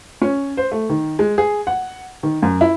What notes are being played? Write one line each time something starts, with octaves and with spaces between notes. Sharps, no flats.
C#4
C5
A3
D#3
G#3
G#4
F#5
D#3
F#2
E4